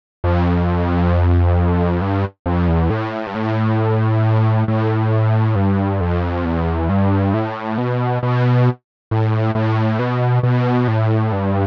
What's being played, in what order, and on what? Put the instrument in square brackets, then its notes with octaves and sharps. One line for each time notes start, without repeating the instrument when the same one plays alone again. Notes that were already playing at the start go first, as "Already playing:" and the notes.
[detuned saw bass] F2
G2
F2
E2
A2
G2
A2
A2
G2
F2
E2
G2
A2
B2
B2
A2
A2
B2
B2
A2
G2